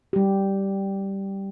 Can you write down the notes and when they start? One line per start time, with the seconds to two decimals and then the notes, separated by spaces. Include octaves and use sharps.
0.13 G3 G4